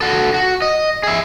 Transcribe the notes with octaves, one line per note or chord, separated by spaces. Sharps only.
F#4 A4
F#4
D#5
G#4 E5